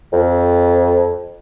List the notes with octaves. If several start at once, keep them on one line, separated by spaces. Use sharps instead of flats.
F2